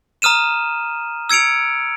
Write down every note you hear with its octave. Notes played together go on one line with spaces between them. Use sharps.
A#5 D#6 F6 D#7 E7
E6 G#6 C#7 D7 F7